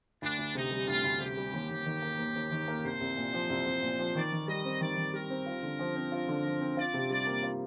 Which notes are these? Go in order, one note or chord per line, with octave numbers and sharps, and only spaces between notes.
D2 D4
D2
C3 D#4
G3
D2 F4
D2
C3 G4
G3
D#2
D#2
D#3
A#3
D#2
D#2
D#3
A#3
C2 C5
C2
A#2
F3
C2
C2
A#2
F3
D#3 D5
D#3
G3 D#5
C4
D#3 D5
D#3
G3 A#4
C4
F4
D3
F3
C4
F4
D3
F3
C4
F4 D5
C3
G3 D5
A#3
F4